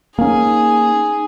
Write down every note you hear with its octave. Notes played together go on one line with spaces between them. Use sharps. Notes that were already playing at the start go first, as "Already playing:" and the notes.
A#3 C#4 D#4 G#4